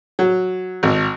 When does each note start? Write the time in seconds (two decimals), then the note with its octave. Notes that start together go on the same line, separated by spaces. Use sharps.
0.19 F#3
0.83 G#1